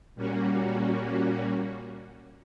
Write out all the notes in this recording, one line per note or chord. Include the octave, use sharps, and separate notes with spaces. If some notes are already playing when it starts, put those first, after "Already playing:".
A#2 G3 A#3 C#4 F#4